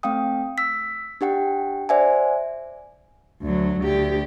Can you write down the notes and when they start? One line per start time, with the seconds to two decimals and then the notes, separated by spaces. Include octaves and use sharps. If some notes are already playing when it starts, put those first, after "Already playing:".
0.03 A3 C4 F5 G5 D#6
0.58 E6 B6
1.21 D4 G4 F#5 G5
1.89 C5 D5 E5 F#5 G#5
3.42 D2 F#3
3.79 D2 G4